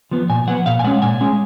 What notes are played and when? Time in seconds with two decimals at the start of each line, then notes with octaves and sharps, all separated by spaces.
0.11 F3 B3
0.29 A#2 G#5
0.47 F3 B3 F#5
0.66 A#2 F5
0.79 G#5
0.84 G#3 C#4 F#5
1.02 A#2 G#5
1.21 G#3 C#4